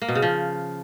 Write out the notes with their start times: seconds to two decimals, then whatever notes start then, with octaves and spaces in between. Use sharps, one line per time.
0.02 A#3
0.08 B2
0.15 C#3
0.22 F3